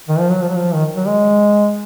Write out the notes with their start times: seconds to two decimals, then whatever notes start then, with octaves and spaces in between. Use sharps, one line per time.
0.09 D#3
0.19 F3
0.30 F#3
0.42 F3
0.49 F#3
0.56 F3
0.74 D#3
0.96 F#3
1.07 G#3